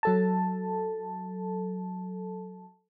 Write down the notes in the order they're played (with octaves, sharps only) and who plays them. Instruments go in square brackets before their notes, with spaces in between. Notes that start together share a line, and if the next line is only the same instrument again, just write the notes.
[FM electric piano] F#3 A4 A5